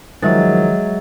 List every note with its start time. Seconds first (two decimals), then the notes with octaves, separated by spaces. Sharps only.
0.23 D#3 F3 F#3 G#3 E5 A6